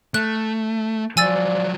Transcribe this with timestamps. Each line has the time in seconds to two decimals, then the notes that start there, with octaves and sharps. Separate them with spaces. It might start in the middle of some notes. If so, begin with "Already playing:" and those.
0.14 A3 F#6
1.17 F3 F#3 F4 C5 D5 G#5 E6 A6